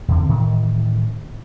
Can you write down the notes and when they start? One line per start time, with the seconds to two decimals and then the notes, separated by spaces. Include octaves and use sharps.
0.08 E2 D3 C4
0.29 A2 D#3 E3